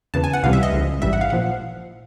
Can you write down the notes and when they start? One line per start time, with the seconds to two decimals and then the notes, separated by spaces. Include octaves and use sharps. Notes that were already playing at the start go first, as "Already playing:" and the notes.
0.14 E2 C#3 E3 A5
0.24 G#5
0.34 F#5
0.43 C#2 C3 E3 G3 F5
0.53 E5
0.63 D#5
0.73 C#2 C#3 F3
1.02 A1 G#2 E3 G3 E5
1.13 F#5
1.21 F5
1.30 A#2 F3 F#5